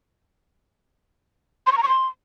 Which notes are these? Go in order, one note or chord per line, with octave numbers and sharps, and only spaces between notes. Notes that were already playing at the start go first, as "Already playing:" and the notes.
C6
C#6
A#5
C#6
C6